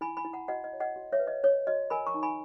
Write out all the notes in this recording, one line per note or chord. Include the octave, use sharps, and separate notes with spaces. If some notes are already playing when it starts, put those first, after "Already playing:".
E4 G#5 B5
G#5 B5
E4
F#5 A#5
F#4 D#5 F#5
D#5
C#5
D#5 F#5
F#4
C#5 E5
B4
D#5
C#5
F#4 D#5
A#4 G#5 B5
A#5 C#6
D#4
G#5 B5